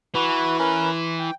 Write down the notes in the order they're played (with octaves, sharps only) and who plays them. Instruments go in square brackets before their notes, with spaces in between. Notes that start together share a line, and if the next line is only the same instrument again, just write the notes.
[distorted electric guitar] E3 [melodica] F#4 B4
[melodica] C#4 A#4 B4
C6
G5